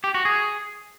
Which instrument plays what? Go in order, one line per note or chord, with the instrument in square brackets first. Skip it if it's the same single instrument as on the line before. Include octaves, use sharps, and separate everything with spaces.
[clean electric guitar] G4
F#4
G#4